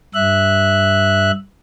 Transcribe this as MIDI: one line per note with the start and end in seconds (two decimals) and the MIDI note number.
0.14 1.31 43
0.14 1.31 76
0.14 1.31 90